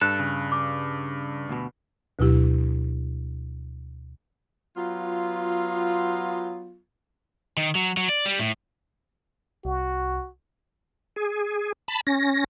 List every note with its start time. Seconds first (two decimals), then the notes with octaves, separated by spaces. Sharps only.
0.01 G2 A4 F#6
0.19 C#3
0.52 D6
1.49 D2 B2
2.19 D2 B2 F#3 E4 G4
4.77 F#3 B3 F4
7.57 D#3
7.75 F#3
7.97 F#3
8.09 D5
8.26 G3
8.39 A2
9.65 C2 F#4
11.16 G#4
11.88 A5 B5
12.07 C#4 A#6